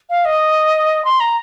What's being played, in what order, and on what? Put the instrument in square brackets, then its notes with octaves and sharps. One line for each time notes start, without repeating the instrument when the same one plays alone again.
[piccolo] F5
D#5
C6
A#5